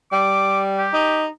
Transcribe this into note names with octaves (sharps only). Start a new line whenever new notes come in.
G3 D6
G4
D#4